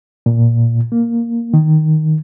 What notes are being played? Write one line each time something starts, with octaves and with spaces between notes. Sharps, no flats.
A#2
A#3
D#3